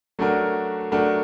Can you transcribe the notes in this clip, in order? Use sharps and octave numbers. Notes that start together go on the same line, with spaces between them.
F#3 A3 D4 F#4 A#4
F#3 A3 D4 F#4 A#4